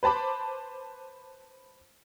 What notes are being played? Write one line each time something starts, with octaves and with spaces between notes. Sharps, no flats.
B4 C5 A5 B5 D6